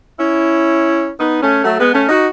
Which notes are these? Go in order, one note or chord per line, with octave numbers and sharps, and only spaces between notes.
C#4 E4
B3 D#4
A3 C#4
F#3 A3
G#3 B3
A3 C#4
D#4 F#4